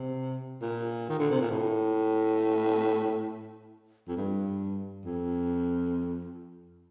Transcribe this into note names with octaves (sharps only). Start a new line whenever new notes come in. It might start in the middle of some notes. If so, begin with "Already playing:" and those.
Already playing: C3
A#2
D#3
D3
C3
A#2
A2
F2
G2
F2